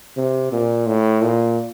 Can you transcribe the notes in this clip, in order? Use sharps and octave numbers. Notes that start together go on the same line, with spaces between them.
C3
A#2
A2
A#2